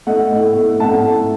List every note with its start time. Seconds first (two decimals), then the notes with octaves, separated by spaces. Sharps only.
0.07 A3 D#5 F#5
0.32 A2
0.56 A3
0.80 A2 F#5 A5
1.05 A3